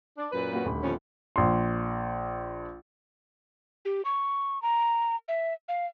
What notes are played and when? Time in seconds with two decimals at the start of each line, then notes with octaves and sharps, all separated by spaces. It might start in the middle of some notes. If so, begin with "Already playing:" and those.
0.18 D4
0.33 F#2 A#2 B4
0.53 A#3 F#4
0.65 D#1 D2 B5
0.83 F2 C#4
1.36 A#1 C6
3.85 G4
4.05 C#6
4.62 A#5
5.28 E5
5.68 F5